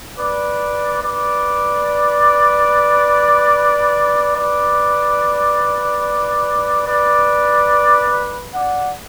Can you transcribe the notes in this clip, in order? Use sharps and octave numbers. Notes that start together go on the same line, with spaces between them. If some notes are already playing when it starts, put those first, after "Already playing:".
B4 D5
B4 D5
B4 D5
B4 D5
D5 F#5